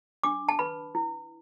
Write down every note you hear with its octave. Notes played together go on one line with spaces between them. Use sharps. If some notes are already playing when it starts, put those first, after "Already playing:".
D4 D6
A5
B4 B5
E4